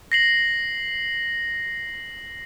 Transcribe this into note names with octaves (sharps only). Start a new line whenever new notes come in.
A#6 C7 F#7